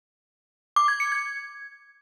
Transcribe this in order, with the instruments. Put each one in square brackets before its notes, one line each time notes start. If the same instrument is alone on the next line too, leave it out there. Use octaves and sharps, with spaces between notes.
[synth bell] D6
G#6
C#7
G#6